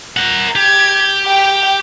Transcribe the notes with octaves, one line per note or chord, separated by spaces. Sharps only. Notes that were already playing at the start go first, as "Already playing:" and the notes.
A#4 F#5
G4 G#6
G5